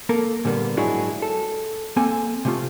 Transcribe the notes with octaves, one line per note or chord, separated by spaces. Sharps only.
A#3 A4 A#4
A#2 D3 G3 A#3 B3
G#2 F#3 D4 E4 F#4 G#4
A4
A#3 C4 A4 G#5
C3 A3 F4